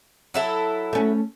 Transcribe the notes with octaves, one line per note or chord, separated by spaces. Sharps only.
F#3 E4 A4
A3 C#4